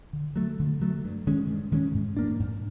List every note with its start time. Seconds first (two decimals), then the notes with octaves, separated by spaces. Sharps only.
0.13 D3
0.36 F#3 A3
0.59 D3
0.82 F#3 A3
1.04 G2
1.27 D#3 G#3 C#4
1.48 G2
1.72 D#3 G#3 C#4
1.94 G#2
2.17 F3 A#3 D4
2.40 G#2